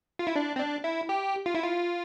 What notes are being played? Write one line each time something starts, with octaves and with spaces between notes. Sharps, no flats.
F4
E4
D4
C4
D4
E4
G4
F4
E4
F4